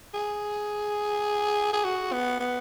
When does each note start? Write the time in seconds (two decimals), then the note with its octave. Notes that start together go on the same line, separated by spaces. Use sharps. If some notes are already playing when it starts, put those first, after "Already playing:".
0.14 G#4
1.73 G#4
1.84 F#4
2.12 B3
2.40 B3